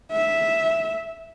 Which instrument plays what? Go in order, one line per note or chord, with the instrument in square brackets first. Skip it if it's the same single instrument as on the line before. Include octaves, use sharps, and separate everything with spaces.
[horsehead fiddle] E5